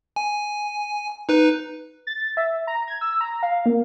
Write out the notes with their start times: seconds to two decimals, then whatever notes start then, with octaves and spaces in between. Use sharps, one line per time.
0.16 G#5
1.29 D#4 B4
2.07 A6
2.37 E5
2.67 A#5
2.88 G#6
3.01 E6
3.21 A#5
3.43 F5
3.66 A#3